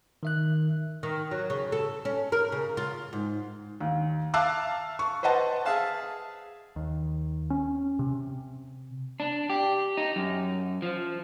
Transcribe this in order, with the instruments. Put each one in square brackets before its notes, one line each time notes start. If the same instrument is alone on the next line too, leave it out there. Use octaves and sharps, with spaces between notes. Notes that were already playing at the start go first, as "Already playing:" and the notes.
[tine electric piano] D#3 E5 F#6
[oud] D#3
F#3
C#3
A4
C#4
A#4
C#3
F4
G#2
[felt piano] D#2
E5 F5 A5 D6 E6 F#6
C#6
B4 C5 D#5 F#5 A5
[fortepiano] G#4 E5 F5 A5
[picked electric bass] D#2
C#4
C3
[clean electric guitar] D4
G4
D#4
F#2
F3